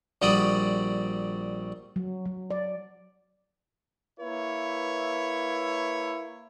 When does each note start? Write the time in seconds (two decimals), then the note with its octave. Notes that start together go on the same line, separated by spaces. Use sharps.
0.22 A#1 G3 F#4 D5 B5 D#6
1.96 F#3
2.26 F#3
2.50 D5
4.20 A#3 E4 B4 C#5